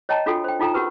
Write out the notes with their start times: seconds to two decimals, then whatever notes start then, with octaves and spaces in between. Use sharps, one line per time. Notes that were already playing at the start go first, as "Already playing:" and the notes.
0.09 C#5 D#5 G5 A5 A#5
0.26 D4 F4 F#4 A4 G5
0.44 C5 G5
0.60 D#4 F4 A4 G5 A#5
0.74 C#4 F#4 G4 A#4 B4